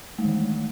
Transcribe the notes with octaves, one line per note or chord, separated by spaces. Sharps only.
D#3 E3 G#3 A3